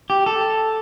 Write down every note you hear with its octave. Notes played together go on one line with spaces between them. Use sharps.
G4
A4